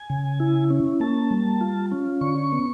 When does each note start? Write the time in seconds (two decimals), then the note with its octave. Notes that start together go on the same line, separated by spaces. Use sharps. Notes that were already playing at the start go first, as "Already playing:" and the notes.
Already playing: G#5
0.10 C#3
0.40 E4
0.70 C#4
1.00 A#3 A5
1.31 G3
1.61 F4
1.92 C#4
2.21 D3 C#6
2.52 B3